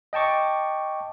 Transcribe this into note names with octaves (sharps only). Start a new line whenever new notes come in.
D#5 G5 A5 C#6 D6